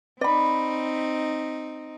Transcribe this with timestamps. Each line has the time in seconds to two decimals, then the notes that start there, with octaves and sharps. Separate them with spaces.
0.21 C4 D#4 D5 B5